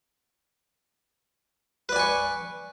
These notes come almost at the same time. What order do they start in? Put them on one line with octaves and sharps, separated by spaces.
B4 D5 G#5 C#6